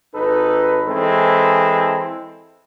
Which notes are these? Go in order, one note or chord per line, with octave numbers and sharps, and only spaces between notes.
G#1 D#4 A4 B4
E3 G#3 C4 E4 A4